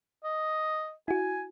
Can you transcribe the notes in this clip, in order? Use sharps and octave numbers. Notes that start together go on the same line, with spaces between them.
D#5
E4 F#4 G#5